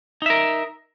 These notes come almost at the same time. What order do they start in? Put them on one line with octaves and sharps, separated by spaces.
D#4 E5 A#4